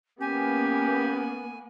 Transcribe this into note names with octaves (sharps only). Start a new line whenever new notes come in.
A#3 B3 C#4 G4 G#5